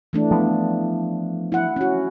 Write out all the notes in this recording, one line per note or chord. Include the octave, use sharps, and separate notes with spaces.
E3 A3 D4
F3 B3
E4 F#5
C#4 F#4